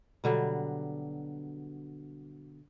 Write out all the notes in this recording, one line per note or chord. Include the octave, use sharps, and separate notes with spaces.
B2 D3 F#3 G3